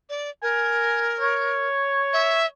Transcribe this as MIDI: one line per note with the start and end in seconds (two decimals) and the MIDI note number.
0.10 0.30 74
0.42 1.67 70
0.42 1.15 80
1.20 2.47 73
2.13 2.46 76